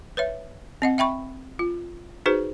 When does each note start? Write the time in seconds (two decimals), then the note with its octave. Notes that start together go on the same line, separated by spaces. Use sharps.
0.17 B4 C#5 E5
0.82 C4 D#5 F#5
0.98 E5 G5 B5 C#6
1.59 F4
2.26 D#4 F#4 G#4 B4 C5